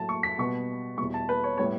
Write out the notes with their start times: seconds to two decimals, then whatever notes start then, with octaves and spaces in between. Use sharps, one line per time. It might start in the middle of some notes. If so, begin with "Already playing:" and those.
Already playing: A2 F#3 A3 A5
0.09 C#6
0.23 B6
0.38 B2 G3 B3 C#6
0.98 E2 B2 G3 C#6
1.14 A5
1.29 B4
1.44 C#5
1.58 A2 G3 B3 C#5